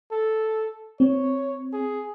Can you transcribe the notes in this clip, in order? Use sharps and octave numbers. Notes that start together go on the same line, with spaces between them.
A4
C4 C#5
G#4